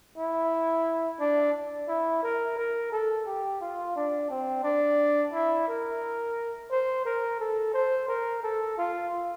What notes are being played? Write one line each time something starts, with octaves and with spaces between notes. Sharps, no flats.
E4
D4
E4
A#4
A#4
A4
G4
F4
D4
C4
D4
E4
A#4
C5
A#4
A4
C5
A#4
A4
F4